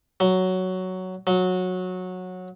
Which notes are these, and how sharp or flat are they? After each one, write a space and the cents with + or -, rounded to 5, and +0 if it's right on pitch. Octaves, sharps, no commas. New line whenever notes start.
F#3 +5
F#3 -15